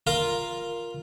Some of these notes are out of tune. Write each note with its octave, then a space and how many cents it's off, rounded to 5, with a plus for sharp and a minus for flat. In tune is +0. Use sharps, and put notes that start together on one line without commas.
F4 +0 A#4 +0